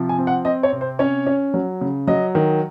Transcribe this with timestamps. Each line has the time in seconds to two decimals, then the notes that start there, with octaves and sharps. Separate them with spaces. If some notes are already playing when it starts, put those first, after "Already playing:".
Already playing: C3 F3
0.09 G#5
0.18 C4
0.27 F#5
0.45 C4 D#5
0.63 C#5
0.72 C3
0.81 C5
0.99 C#4 C#5
1.27 C#4
1.54 F#3
1.81 C#3
2.07 F#3 D#5
2.35 D#3